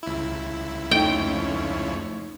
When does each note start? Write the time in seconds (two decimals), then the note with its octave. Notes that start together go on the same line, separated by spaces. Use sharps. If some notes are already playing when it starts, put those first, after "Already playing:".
0.03 C#2 E4
0.91 F2 A3 C#4 D#4 G5